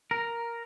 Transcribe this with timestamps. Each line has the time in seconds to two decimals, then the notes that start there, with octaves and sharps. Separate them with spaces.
0.11 A#4